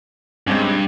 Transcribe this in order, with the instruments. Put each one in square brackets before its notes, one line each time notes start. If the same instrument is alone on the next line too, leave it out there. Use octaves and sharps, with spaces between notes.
[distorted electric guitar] G2 [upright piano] G#3 C4 C#4